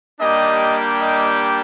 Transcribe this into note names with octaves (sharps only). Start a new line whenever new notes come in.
G3 A#3 D4 G4 D#5
D#5